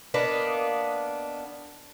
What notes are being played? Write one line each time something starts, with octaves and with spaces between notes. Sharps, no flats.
A#3 B3 D4 D#5